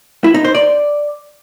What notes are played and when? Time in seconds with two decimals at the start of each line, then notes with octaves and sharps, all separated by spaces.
0.24 E4
0.34 D#4
0.44 C5
0.55 D5